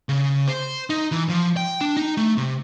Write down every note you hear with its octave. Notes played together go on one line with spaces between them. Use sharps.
C#3
C5
D#4
E3
F3
G5
D4
D#4
A3
C3